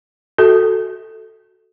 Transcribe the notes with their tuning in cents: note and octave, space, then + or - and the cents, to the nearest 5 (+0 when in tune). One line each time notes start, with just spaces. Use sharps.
F#4 +0 A4 +0